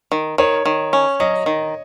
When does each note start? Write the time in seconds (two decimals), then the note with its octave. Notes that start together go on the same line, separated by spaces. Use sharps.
0.12 D#3
0.38 D#3 C#5
0.65 D#3
0.93 C#4
1.20 F#3 D#5
1.46 D#3